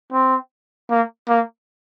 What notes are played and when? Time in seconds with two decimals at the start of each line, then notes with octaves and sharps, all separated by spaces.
0.12 C4
0.90 A#3
1.29 A#3